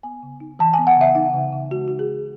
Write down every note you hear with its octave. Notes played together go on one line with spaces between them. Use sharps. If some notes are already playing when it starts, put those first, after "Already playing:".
B3 G#5
C#3
D#4
E3 A5
G#5
B3
F#5
C#3 E5
D#4
C#3
C#3
G#3 F#4
D#4 F#4
G#4
C#3